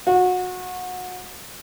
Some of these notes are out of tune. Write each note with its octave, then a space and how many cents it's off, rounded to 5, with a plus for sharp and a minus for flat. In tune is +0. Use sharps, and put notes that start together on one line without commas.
F#4 -25